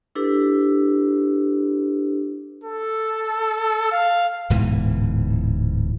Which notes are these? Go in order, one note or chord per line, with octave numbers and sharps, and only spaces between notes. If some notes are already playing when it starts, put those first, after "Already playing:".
D4 E4 G4 A4 B4
A4
F5
D1 G#2 B2 E3